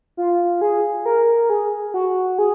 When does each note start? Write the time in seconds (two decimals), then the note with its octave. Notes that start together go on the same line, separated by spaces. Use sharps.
0.17 F4
0.61 G#4
1.06 A#4
1.50 G#4
1.94 F#4
2.38 G#4